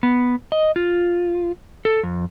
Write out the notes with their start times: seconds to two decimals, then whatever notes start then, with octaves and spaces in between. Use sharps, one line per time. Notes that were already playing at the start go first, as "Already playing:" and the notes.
0.03 B3
0.52 D#5
0.76 F4
1.85 A4
2.03 F2